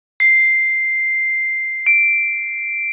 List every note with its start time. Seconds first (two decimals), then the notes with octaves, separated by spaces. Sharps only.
0.20 C7
1.86 D7